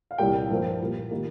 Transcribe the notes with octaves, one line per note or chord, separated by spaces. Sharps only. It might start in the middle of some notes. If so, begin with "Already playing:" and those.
F5
C2 A#2 G3 A#3 G4 G5
G2 F3 A#3
A#2 G3 A#3
D#3 G3 A#3